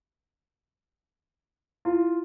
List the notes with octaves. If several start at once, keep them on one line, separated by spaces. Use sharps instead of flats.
E4 F4